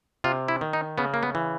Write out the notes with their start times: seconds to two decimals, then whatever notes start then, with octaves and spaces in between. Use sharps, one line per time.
0.24 C3 F4
0.48 E4
0.61 D#3
0.73 D#4
0.98 C#3 B3
1.14 A#3
1.23 B3
1.35 E3